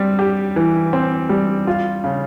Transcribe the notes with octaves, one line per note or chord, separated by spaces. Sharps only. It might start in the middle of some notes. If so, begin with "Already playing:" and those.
Already playing: G3 C4
G4
E3
C4
G3
F4
C#3